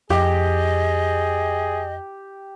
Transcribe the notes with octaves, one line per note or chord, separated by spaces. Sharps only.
F2 G4 G#4 D#5